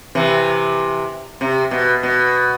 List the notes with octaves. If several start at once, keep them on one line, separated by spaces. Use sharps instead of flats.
C3 E3
C3
B2
B2